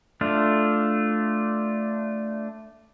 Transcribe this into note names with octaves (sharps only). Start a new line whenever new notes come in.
A3 D4 F4